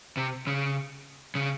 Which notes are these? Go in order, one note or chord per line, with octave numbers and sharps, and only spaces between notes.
C3
C#3
C#3